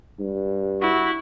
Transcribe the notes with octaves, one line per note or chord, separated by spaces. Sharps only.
G2
E4 F#4